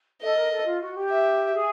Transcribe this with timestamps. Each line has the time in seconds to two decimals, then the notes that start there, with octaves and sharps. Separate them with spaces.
0.22 A4 D#5
0.37 A#4
0.51 A4
0.66 F4
0.81 F#4
0.95 G4
1.10 E5
1.54 G#4